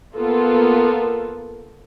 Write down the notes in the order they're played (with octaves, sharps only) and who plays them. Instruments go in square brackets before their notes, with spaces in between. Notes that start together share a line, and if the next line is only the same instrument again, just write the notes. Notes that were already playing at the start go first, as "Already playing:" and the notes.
[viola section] A#3 B3 F4 A4 A#4